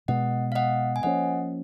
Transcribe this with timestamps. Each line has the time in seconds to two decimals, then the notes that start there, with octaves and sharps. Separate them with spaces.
0.08 B2 G#3 B3 D#5 F#5
0.52 F5
0.55 D#5 F#5
0.96 G#5
1.03 F3 A#3 C#4 D#5 F#5